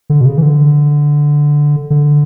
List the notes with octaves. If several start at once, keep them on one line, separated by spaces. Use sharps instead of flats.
D3
B2
C#3
E3
D3
D3